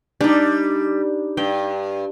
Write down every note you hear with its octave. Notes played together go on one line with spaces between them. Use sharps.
G3 D4 D#4
G2 G5